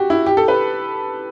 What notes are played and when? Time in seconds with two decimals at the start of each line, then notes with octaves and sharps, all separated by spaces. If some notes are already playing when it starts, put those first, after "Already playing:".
Already playing: F#4 G4
0.10 E4
0.26 G4
0.37 A4
0.48 B4